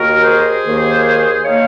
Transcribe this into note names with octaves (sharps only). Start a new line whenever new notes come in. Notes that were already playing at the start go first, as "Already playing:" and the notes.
Already playing: D#2 D#3 A#3 F#4 A#4
G#4 C5
D#2 D#3 A#3
D#3 A#3 C#5 F5